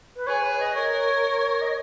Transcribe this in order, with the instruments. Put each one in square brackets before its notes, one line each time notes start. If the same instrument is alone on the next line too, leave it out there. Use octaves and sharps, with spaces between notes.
[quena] B4
[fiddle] G#4 [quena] C#5
[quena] B4
D#5
[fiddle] A#4 [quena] C#5
[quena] D#5